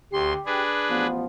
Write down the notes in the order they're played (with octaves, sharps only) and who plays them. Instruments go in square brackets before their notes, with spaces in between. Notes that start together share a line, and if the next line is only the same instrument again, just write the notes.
[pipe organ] D2 C6 [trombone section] G4
[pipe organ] D4 G#4 B4
[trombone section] A1 F3 B3